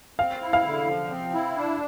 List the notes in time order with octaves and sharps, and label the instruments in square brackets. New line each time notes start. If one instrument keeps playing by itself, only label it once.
[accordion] C4 [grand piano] F5
[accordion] E4
[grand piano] F5
[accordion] D3
F3
C4
E4
D4